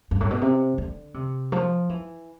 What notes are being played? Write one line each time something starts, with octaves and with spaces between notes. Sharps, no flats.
G2
A2
B2
C3
D3
C3
F3
E3